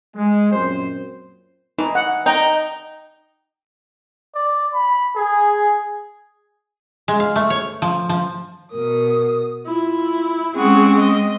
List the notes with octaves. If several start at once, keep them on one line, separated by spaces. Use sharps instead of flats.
G#3
F#2 A#2 C4 C5
E3 D#4
F#5
D#4 G5 A#5
D5
B5
G#4
G#3
F5
A3
C#5
F3
F3
B2 A#4 D#6
E4 F4
G#3 C4 C#4 G#4 F#5 C#6
D#5